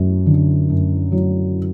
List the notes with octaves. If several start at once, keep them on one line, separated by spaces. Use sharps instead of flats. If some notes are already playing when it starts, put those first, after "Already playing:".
Already playing: F#2 F#3
D3
F#2
F#3